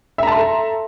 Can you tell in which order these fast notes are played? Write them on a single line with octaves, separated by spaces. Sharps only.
E5 A#5 A5 C6 A4